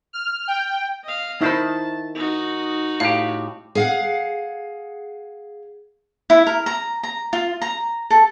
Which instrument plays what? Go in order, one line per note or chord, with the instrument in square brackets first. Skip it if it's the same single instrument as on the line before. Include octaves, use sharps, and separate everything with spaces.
[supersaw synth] F6
G5
[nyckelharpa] D#5 F5
[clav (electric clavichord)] D#3 [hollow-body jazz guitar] E4 C5 B5 [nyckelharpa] A5
[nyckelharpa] D#4 F#4
[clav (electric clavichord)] A2 G4 [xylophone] F5
[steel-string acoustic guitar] G#4 F5 F#5
[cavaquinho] E4
A#4
A#5
A#5
F4
A#5
A4